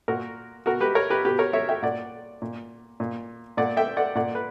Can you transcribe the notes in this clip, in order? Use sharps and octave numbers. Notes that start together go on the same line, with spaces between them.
A#2 F#4 A#4
B2 F#4 A#4
G4 B4
A#4 C#5
G4 B4
B2 G4 B4
A#4 C#5
C#5 E5
E5 G5
A#2 D5 F#5
A#2
A#2
A#2 D5 F#5
E5 G5
D5 F#5
A#2 D5 F#5
B4